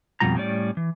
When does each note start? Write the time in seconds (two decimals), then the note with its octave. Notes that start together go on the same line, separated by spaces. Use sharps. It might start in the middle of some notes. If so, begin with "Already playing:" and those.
0.20 F2 G#2 B2 G3 F4 A#5
0.35 A2 G3 C#4 D5
0.77 E3